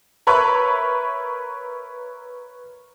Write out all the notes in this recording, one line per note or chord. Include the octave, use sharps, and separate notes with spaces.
A#4 B4 C#5 E5 B5